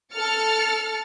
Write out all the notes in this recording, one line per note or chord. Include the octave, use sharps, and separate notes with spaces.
A4 F6 A6 C#7